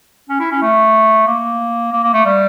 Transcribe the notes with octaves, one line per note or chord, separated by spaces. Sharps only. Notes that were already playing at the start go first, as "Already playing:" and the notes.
C#4
E4
C#4
A3
A#3
A#3
A#3
A3
G3